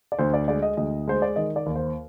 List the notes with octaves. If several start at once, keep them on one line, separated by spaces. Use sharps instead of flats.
D5
D2 C5
D5
G#3 D5
D#5
D2 D#5
G#3 C5
D5
D#3 D#5
D5
D#2
C5